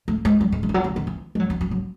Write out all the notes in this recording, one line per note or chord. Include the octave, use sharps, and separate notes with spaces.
A3
G#3
F#3
G#3
G#3
E3
F#3
E3
D#3
E3
G#3
F#3
F#3
F#3
F#3